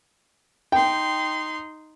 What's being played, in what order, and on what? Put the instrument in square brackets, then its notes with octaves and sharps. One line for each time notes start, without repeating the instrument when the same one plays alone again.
[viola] D#4 C6 [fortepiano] G5